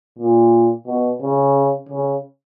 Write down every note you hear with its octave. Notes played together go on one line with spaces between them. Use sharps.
A#2
B2
C#3
C#3